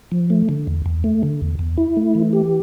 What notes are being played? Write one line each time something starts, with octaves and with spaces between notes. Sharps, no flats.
F3
A3
D3
E2
E2
A3
D3
E2
E2
E4
A3
E3
G4